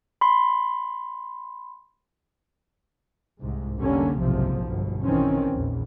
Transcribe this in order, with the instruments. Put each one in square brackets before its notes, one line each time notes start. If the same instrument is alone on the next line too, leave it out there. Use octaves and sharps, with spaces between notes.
[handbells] B5 C6
[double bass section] C2 G#2
F1 D3 G3 A#3 C#4
F#1 B1 G#2 C3 F3
G1 B2
A#1 D#3 E3 C4 C#4
A#1 E2